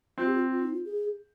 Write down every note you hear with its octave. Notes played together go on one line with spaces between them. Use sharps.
C4 F4
G4
F4
F4
D#4
F4
G#4